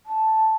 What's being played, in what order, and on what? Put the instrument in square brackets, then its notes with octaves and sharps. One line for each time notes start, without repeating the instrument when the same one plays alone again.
[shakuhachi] A5